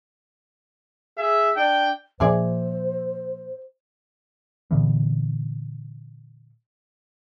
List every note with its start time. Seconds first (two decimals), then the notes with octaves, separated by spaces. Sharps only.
1.17 G#4 E5
1.56 D4 G5
2.20 A#2 F3 E4 G#4 C5 D5
4.71 A#2 D3 E3 B3